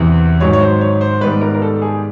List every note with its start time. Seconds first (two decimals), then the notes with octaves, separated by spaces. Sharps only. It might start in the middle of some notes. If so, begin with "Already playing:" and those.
Already playing: E2 C3 E3
0.40 G#2 D#3 F#3 C#5
0.53 C#5
0.61 C5
0.81 C#5
1.01 C5
1.21 G#2 D#3 G3 B3 B4
1.41 A#4
1.54 A#4
1.62 A4
1.82 G#4